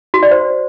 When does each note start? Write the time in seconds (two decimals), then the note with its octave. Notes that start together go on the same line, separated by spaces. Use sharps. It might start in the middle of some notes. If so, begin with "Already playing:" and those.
0.14 F#4
0.23 D5
0.31 C5